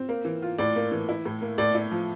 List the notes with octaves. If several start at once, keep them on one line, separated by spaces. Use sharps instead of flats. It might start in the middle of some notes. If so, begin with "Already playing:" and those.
Already playing: C4
A#3
E3
F4
A2 D5
A#3
E3
E4
A2
A#3
A2 D5
E4
F3